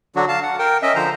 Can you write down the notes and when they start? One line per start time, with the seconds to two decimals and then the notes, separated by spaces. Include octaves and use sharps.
0.16 D3 F#3 D4 F#4
0.28 F5 A5
0.43 F#5
0.59 A#4 G5
0.82 C#4 D#5 E5
0.95 D3 F3 C5 A#5